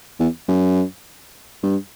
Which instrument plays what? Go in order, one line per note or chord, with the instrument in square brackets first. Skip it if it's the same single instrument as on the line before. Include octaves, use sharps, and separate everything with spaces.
[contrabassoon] E2
F#2
G2